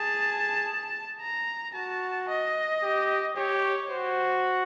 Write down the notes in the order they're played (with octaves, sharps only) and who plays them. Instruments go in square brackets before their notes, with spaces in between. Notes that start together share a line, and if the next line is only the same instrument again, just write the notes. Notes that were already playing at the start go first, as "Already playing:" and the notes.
Already playing: [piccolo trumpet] G#4 [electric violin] A5
[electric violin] A#5
[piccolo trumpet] F#4 [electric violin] A5
[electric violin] D#5
[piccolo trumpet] G4
[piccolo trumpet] G4 [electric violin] C#5
[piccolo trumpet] F#4 [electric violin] C5